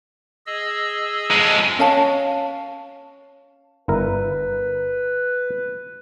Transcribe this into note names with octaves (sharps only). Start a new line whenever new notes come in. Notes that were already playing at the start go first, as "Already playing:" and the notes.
G#4 D#5 E6
F2 G#3
C#4 F5 A5
G1 E4 A#4 B4